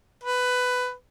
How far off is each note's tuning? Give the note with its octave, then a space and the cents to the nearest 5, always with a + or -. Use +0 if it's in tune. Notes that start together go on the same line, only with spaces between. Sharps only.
B4 +15